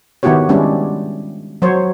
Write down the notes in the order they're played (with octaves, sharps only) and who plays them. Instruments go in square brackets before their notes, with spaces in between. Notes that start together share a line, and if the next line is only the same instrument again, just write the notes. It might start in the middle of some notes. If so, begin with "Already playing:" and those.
[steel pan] D#3 B3 E4 F#4 G4 C#5
G3 G#3 C#4 D4 E4
F#3 C5 C#5